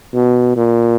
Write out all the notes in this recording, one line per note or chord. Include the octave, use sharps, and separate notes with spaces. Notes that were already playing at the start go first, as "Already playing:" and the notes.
B2
A#2